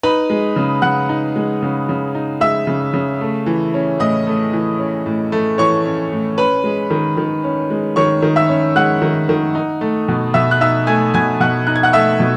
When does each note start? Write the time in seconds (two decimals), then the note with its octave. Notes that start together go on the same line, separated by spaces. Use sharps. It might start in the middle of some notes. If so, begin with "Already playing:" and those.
0.03 D#4 B4 B5
0.30 G#3
0.56 C#3
0.82 C#3 F#5 F#6
1.09 D#4
1.36 G#3
1.62 C#3
1.89 C#3
2.15 D#4
2.41 G#3 E5 E6
2.67 C#3
2.94 C#3
3.21 A3
3.46 E3
3.74 C#4
3.99 A2 D#5 D#6
4.27 A3
4.53 E3
4.79 C#4
5.06 A2
5.32 A3
5.58 E3 C#5 C#6
5.86 C#4
6.12 A2
6.38 C#4 B4 B5
6.64 G#3
6.91 D#3
7.17 D#3
7.44 C#4
7.70 G#3
7.96 D#3 C#5 C#6
8.22 D#3
8.36 E5 E6
8.49 C#4
8.76 G#3 F#5 F#6
9.02 D#3
9.29 D#3
9.55 D#4
9.81 A3
10.08 B2
10.34 B2 E5 E6
10.51 F#6
10.61 D#4 E5 E6
10.87 A3 G#5 G#6
11.14 B2 G#5 G#6
11.40 B2 F#5 F#6
11.67 D#4 F#6
11.76 G#6
11.83 F#5 F#6
11.93 A3 E5 E6
12.20 B2